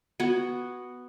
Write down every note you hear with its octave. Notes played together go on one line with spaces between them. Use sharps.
B3 F#4